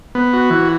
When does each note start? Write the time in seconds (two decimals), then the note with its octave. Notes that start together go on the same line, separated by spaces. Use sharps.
0.15 B3
0.33 F#4
0.50 E3